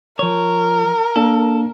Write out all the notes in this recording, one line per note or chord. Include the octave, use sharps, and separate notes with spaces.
F3 A#4 C#5
A#3 D4 A4